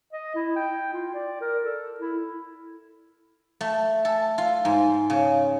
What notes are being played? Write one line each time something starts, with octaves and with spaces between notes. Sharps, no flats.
D#5
E4
G5
F4
D5
A#4
A4
E4
A3
A4
F4
G#2
C#3